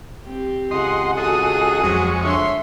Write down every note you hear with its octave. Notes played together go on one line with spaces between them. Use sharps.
C4 G4
C#2 G#4 D#5 F#5 C6
F#4 G#4 A4 D#5 D#6
F2 F#3 G#3 C#6
D3 C#5 E5 C6